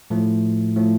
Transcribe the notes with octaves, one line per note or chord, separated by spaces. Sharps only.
A2 F3 A3
A2 F3 A3